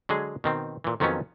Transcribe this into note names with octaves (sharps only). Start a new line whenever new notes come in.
D3 F#3 G#3 G#4
B2 D#3 C4
A#2 E3
F2 D#3 F3 F#3 B3 C#4